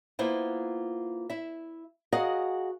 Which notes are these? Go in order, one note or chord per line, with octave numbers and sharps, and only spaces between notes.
A#3 B3 E4 F4 C5
E4 E5
F#4 G#4 A#4 D#5 F5 F#5